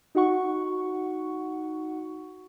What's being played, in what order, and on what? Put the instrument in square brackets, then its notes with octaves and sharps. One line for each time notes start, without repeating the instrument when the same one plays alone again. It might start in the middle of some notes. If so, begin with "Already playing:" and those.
[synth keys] D#4 F#4 F#5 C#6